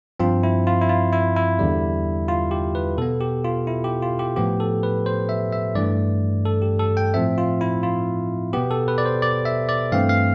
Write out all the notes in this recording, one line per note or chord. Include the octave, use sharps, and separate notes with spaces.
G2 F3 C4 F4
E4
F4
E4
F4
E4
E4
E2 D3 G3
F4
G4
B4
B2 B3 A4
G4
F4
E4
G4
F4
G4
A2 F3 B3 G4
A4
B4
C5
E5
E5
G2 E3 A3 D5
A4
G4
A4
G5
A2 F3 C4 E5
F4
E4
F4
B2 B3 G4
A4
B4
D5
C5
D5
E5
D5
G2 E3 A3 C4 F5
F5